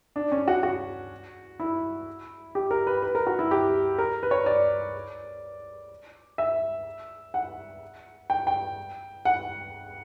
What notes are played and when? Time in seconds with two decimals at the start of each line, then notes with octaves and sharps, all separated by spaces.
0.16 D4
0.32 C#4
0.48 F#4
0.63 F#4
1.60 E4
2.55 G4
2.71 A#4
2.87 B4
3.03 B4
3.15 A#4
3.27 F#4
3.39 E4
3.51 G4
3.98 A#4
4.23 B4
4.31 C#5
4.46 D5
6.38 E5
7.34 F#5
8.30 G5
8.47 G5
9.25 F#5